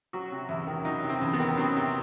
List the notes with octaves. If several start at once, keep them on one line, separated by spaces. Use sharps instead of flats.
F#3 F#4
C3
E2 E4
D#3
F#3 D#4
C3
C4
E2
B3
D#3
F#3 C4
C3